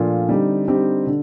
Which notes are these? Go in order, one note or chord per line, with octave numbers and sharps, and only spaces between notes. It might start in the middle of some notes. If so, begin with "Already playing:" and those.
Already playing: A#2 F3 A3 D4 F4
D3 G3 C4 D#4 G4
D3 G3 C4 D#4 G4
D3